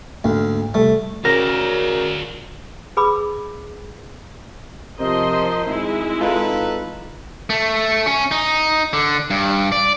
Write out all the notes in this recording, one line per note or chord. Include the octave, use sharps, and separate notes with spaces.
D2 G#2 A3 A#3
C3 G3 A3
C#3 F#4 A#4 D5 A#6
G#4 B4 B5 D6 E6
C3 F3 A#4 C5 D#5 C6
G#1 G#3 E4
D#4 F4 A4 B4
A3
C#4
D#4
D3
G2
D5